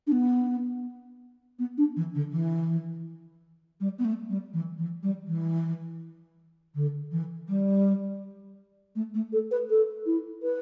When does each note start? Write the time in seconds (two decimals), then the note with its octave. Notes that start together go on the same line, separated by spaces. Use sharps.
0.07 D4
0.12 B3
1.59 B3
1.78 D4
1.96 E3
2.15 D3
2.33 E3
3.80 G3
3.99 B3
4.05 A3
4.30 G3
4.53 E3
4.78 E3
5.03 G3
5.27 E3
6.75 D3
7.11 E3
7.49 G3
8.96 A3
9.14 A3
9.33 A4
9.51 B4
9.70 A4
10.06 E4
10.43 B4